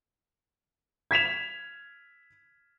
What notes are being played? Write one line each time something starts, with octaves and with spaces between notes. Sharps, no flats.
G#6 B6 E7 F7